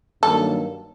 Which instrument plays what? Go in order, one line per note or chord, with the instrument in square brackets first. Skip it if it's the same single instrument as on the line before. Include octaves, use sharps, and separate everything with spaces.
[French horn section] G2 D#3 F#3 A#3 [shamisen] A4